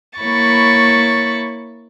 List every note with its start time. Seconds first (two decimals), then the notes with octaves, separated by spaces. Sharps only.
0.19 A#3 E4 C#5 B5 C#6 A6